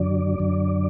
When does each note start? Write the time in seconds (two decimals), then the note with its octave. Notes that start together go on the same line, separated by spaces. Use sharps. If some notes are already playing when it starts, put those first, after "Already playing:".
Already playing: F#2 D3 F#3 D5
0.38 F#2 D3 F#3